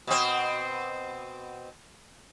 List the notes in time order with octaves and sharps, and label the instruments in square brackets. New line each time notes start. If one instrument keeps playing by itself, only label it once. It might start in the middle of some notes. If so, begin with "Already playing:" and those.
[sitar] B2 C4